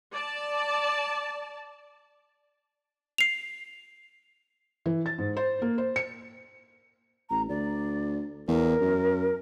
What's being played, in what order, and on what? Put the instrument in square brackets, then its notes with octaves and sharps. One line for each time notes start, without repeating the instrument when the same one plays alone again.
[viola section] D5 A5
[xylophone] C7 F7
[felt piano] E3
A6
G#2
C5
A#3
C5
C#7
[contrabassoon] A1 [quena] A#5
[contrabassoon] D2 [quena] D5
[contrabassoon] E2 [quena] A#4
[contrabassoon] F#2